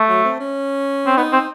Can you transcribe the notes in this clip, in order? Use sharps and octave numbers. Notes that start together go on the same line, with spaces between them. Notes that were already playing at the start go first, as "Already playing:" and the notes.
Already playing: A3
F#3
C4
C#4
C4
B3 D#4
C4